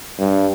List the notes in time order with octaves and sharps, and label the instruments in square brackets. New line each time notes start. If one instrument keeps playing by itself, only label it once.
[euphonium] G2